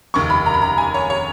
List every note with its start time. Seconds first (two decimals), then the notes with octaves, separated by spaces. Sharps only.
0.14 F1 D#2 C#3 C#6
0.30 B5
0.46 A#5
0.54 B5
0.62 A#5
0.78 G#5
0.94 C#5
1.10 C#5